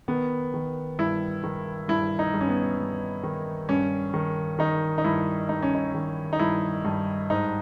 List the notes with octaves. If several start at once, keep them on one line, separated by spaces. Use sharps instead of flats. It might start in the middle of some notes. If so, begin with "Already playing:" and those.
D#3 B3
D#3
G2 E4
D#3
G2 E4
D#4
G2
C#4
B3
G2
D#3
G2 C#4
D#3
D#3 D#4
D#4
G2 E4
G2 D#4
C#4
D#4
D#3
D#4
G2 E4
G2
G#2 D#4